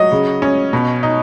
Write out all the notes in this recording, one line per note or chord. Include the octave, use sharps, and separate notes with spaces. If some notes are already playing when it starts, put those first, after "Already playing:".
Already playing: F#3 D#5
C#3
C#4
B2
D#4